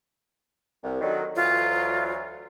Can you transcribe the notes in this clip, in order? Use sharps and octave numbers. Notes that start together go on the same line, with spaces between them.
C2
D3 D#3 F#3
D2 E3 F#3 F4